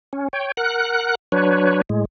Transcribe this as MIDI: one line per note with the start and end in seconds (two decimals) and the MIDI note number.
0.13 0.28 61
0.33 0.52 73
0.33 0.52 79
0.57 1.15 70
0.57 1.15 78
0.57 1.15 90
1.32 1.82 54
1.32 1.82 62
1.32 1.82 71
1.32 1.82 73
1.89 2.05 45
1.89 2.05 56